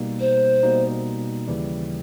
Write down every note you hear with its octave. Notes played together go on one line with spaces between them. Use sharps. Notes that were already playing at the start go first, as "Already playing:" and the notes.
Already playing: B2 G3 A#3 D#4
C5
B2 G3 A#3 D#4
D#2 C#3 E3 G3